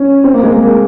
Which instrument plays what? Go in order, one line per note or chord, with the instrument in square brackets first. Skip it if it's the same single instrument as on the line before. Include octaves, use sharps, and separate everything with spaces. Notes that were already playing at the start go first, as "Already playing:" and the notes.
Already playing: [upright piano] C#4
C4
A#3
G#3
A#3
A#3